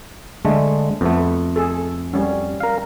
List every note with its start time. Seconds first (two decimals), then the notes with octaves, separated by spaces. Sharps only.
0.45 D3 G#3 A3
1.01 F2 A3 B3
1.56 G#4 A4
2.14 G3 C#4
2.60 A#4 F5